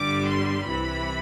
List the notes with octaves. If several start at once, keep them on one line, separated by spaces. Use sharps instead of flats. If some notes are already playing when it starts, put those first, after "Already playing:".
Already playing: G1 G2 D3 G3 D6
C6
C2 C3 E3 B5